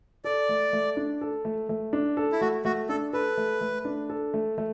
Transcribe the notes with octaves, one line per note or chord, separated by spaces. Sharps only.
A4 D5
A3
A3
D4
A4
A3
A3
D4
A4
E4
A3 F#4
A3 F#4
D4 A4
A4 B4
A3
A3
D4
A4
A3
A3